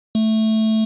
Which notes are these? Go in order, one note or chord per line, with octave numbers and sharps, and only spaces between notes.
A3